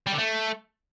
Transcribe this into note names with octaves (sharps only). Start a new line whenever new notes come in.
G3
D3
A3